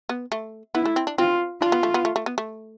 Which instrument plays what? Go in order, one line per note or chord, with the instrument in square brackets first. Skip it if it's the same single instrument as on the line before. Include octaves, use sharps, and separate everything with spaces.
[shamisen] B3
A3
[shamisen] B3 [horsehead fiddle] E4
[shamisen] A3
C4
D4
[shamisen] C4 [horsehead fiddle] F4
[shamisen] D4 [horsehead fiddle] F4
[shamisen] B3
A3
B3
A3
A3
B3
A3